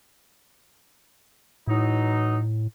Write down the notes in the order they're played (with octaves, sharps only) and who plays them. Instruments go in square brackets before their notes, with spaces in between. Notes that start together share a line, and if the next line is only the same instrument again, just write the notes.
[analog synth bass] A2 [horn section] E3 F#3 D#4